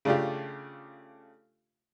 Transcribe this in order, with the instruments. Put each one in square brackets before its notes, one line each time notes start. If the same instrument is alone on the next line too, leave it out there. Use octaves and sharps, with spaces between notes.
[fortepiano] C#3 A3 D4 F4 G4